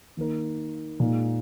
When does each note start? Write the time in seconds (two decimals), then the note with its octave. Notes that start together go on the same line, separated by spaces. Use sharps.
0.17 D#3 A#3 D#4 A#4
1.00 A#2 G#3 D#4 G#4